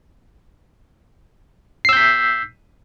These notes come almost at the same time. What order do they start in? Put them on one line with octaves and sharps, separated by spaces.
C7 E6 G6 B6